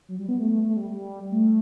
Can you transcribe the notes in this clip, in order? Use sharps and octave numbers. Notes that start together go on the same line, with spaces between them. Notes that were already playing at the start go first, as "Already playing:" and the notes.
F#3
G3
B3
A3
A3
A3
G3
G3
A3